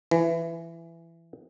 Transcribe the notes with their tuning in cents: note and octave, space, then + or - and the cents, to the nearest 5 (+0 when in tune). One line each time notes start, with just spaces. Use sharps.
E3 +15